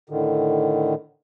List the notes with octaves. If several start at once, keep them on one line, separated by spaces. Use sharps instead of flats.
A2 D3 D#3